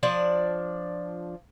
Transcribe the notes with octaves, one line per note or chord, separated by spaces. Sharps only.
F3 D4 D5